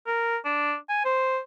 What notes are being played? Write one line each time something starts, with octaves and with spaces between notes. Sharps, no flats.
A#4
D4
G#5
C5